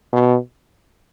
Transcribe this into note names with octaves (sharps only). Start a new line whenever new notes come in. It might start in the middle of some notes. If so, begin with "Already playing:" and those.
B2